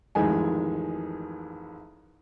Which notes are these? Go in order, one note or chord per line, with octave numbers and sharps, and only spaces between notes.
A1 F2 D#3 G#3 G#5